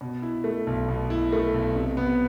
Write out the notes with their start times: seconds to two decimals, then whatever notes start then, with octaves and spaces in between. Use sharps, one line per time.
0.01 B2
0.22 E4
0.44 A3
0.67 B1
0.89 B2
1.10 E4
1.33 A3
1.54 B1
1.76 C3
1.97 B3